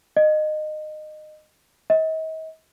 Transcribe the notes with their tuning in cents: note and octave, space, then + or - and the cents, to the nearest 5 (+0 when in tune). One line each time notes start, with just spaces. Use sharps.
D#5 -20
D#5 +40